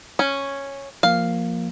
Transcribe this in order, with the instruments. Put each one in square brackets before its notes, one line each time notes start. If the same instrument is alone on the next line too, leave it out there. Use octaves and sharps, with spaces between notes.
[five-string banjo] C#4
[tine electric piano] F3 A#3 [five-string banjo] F5